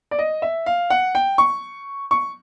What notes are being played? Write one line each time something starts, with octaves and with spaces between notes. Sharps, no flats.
D5
D#5
E5
F5
F#5
G5
C#6
C#6